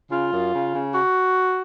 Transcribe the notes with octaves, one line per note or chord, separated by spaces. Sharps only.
C#3 F4
F#2
C#3
C#3
F#4